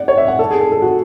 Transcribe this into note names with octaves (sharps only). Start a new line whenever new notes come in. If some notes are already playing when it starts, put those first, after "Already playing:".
Already playing: D5 F#5
C#5
E5
F#5
A4
G#4
A4
A4
F#4